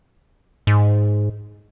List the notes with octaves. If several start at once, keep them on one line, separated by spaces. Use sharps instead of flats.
G#2